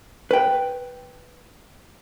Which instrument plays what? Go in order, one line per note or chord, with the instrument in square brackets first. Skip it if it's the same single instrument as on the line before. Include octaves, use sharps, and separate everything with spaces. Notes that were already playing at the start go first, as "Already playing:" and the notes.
[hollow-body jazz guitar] B4 G5